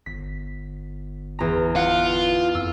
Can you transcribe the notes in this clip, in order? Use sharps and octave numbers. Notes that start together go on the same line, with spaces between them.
G1 B6
E2 A#5
F4 F#5
F2 E6